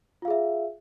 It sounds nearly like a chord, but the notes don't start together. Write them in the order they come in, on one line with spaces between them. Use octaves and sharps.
F4 F5 G#4 E5